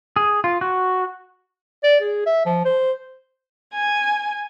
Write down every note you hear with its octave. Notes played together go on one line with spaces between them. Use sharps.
G#4
F4
F#4
D5
G#4
E5
F3
C5
G#5